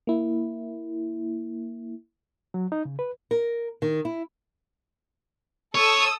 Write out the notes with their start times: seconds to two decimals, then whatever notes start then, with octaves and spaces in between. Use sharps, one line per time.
0.07 A#3 E4
2.54 F#3
2.72 D#4
2.85 C#3
2.99 B4
3.31 A#4
3.82 D#3
4.05 E4
5.75 A4 C#5 D#6 E6